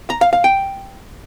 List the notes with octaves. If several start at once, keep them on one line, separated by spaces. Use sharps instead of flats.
A#5
F5
F5
G5